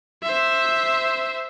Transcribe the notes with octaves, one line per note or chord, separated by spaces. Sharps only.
C5 E5